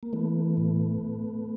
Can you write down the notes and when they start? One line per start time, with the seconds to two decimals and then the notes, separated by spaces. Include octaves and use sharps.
0.03 A#3
0.13 E3 A3 B3
0.57 A2